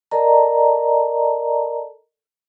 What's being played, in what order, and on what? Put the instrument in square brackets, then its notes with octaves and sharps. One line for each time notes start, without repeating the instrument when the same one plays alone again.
[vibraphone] A4 A#4 D5 D#5 A5 A#5